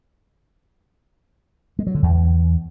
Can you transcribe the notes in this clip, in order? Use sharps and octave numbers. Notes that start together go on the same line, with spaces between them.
G#3
F#3
D3
E2